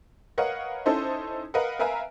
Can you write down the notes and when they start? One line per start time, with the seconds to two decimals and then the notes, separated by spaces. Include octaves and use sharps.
0.38 A#4 B4 C#5 D#5 F5 F#5
0.86 C#4 D#4 E4 A4 C5 D#5
1.54 A#4 B4 D#5 F5 F#5
1.79 A#4 B4 E5 F5 G#5 A#5